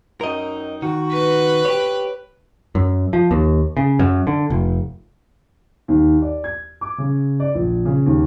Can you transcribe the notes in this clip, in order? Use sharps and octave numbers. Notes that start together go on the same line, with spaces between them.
F#2 D#4 A#4 D#5 G5
D#3 F#4
B4
G4 C#5
F#2
F3
D#2
C#3
F#2
D3
F1
D#2
D5
G#6
D6
C#3
D5
A#1
C#3
D#2